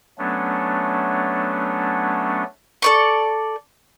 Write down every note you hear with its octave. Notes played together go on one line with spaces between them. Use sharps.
F#3 A3 B3 C#4 D4
A4 D5 C#6